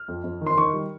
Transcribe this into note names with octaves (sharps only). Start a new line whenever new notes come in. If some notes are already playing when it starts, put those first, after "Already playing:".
Already playing: F6
F2
F2
D#3
C6
D#3 C#6
G3